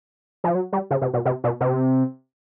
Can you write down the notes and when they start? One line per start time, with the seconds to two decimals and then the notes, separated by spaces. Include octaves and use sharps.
0.44 F3
0.55 F#3
0.73 G3
0.91 C#3
1.01 C3
1.14 B2
1.25 C3
1.44 B2
1.61 C3